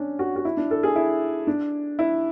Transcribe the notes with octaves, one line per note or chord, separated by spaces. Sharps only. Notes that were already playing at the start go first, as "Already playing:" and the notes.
Already playing: C#4 D4
F#4
F#4
E4
D4
A4
G#4
E4
D4
E4